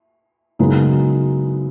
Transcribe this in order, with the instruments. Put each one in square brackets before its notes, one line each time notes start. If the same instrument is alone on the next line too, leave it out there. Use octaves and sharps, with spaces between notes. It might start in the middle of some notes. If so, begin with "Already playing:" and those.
[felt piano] F#2 C#3 G#3 B3 D#4